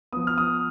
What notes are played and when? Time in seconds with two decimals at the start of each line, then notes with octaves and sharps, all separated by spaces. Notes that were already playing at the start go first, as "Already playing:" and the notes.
0.13 F3 B3 D#6
0.27 F6
0.38 D#6